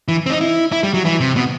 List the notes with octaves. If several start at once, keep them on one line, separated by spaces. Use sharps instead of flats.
E3
C4
D#4
E4
E4
G3
F#3
E3
C3
B2